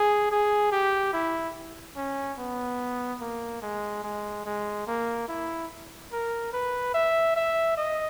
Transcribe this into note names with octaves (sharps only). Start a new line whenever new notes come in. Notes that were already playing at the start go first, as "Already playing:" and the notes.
Already playing: G#4
G#4
G4
E4
C#4
B3
A#3
G#3
G#3
G#3
A#3
E4
A#4
B4
E5
E5
D#5